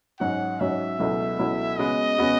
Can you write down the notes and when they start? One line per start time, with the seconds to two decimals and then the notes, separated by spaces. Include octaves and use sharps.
0.20 G#2 F#3 C#4 F#4 F#5
0.60 G#2 F#3 C#4 F#4 E5
0.99 C#2 B2 F#3 A3 E4
1.39 C#2 B2 F#3 A3 E4
1.78 C#3 G#3 B3 F#4 D#5
2.18 C#3 G#3 B3 F#4